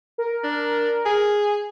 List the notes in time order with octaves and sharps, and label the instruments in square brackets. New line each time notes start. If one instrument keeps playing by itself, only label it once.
[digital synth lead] A#4
[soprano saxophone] D4
G#4